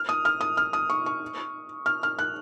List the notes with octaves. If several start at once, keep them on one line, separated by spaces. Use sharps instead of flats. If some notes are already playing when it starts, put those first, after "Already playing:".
Already playing: F6
D#6
F6
D#6
F6
D#6
C#6
C#6
F6
F6
F#6